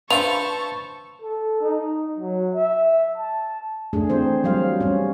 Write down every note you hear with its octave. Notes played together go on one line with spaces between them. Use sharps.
D4 F4 B4 C5 E5 A5 C#6 F7
A4
D#4
F#3
E5
A5
A3 D4 G#4
E3 C4 C5
F#3 G3 C5 F5
G3 C#4